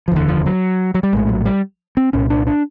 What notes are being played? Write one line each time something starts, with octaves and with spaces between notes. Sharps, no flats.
F3
F1 D#2 D3 E3
F3
F#3
F#3
G3
A#1 A2 G#3
F#3
G3
C4
C2 A#2 C#4
D4
D4